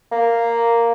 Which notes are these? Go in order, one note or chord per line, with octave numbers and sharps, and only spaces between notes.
A#3